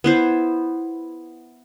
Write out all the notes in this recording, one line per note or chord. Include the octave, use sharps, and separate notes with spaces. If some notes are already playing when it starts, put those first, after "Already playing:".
B3 E4 C5